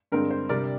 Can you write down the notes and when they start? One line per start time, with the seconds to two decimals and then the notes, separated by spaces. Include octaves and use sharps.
0.12 G2 D3 G#3 C4 A#4
0.31 C5
0.49 C3 G3 D4 A#4 D5